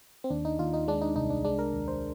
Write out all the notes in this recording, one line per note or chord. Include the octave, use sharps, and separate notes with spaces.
C4
D#2 D4
D#4
D#2 F4
D#4
G#3 D4
D#4
C2 D#4
D4
G#3 D4
A#4
D#2
C5